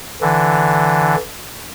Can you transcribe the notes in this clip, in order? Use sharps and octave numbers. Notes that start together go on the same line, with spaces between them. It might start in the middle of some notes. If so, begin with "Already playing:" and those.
D3 E3